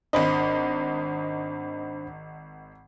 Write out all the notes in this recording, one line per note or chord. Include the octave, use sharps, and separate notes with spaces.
G#1 D4 C5 D#5 B5